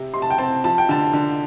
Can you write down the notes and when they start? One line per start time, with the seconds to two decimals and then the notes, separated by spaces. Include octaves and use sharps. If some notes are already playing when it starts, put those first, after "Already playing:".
Already playing: C3
0.14 C3 C6
0.22 A5
0.30 G5
0.38 C4 A5
0.64 F3 A5
0.78 G5
0.89 D3 A5
1.13 D3